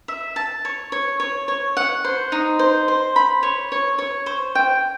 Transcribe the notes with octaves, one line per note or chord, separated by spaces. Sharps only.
E5
A5
C#5
C#5
C#5
C#5
F#5
C5
D#4
C5
C5
B5
C#5
C#5
C#5
C5
G5